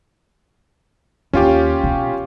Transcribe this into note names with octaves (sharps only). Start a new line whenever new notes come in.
D#2 C#4 F4 G4
B2